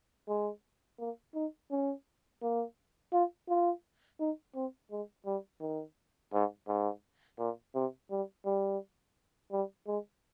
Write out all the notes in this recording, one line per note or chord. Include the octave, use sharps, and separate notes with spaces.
G#3
A#3
D#4
C#4
A#3
F4
F4
D#4
C4
G#3
G3
D#3
G#2
G#2
A#2
C3
G3
G3
G3
G#3